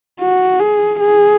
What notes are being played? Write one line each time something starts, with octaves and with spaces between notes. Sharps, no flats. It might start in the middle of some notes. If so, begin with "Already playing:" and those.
F#4
G#4
G#4